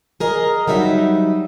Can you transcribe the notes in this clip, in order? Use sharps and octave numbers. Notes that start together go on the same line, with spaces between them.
G#4 A#4 D#5
F#3 G3 D#4 E5